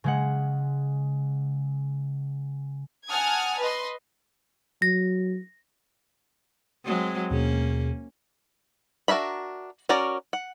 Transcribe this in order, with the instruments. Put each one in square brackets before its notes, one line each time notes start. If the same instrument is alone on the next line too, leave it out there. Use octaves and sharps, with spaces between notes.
[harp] C#3 G#3 F#5
[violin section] F#5 G#5 A5 D#6 F6 G#6
B4 D#5 C6
[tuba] F#3 [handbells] A#6
[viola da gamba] F#3 G#3 C4
[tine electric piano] D#2 B2 G#4 [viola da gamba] A#3 C#4
[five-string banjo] D4 F#4 A#4 E5 B5
C#4 F#4 A#4 D5 A#5
F#5